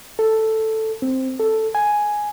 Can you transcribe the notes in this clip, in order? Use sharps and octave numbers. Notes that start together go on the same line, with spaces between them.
A4
C4
A4
G#5